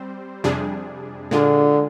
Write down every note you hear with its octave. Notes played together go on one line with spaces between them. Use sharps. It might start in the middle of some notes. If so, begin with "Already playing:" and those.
Already playing: G3 C4 C5
F2 C3 G3 D4 G#4
A#2 D3 G#3 D4 F4 G#4